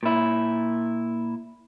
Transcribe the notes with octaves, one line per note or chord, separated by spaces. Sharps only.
A#2 E4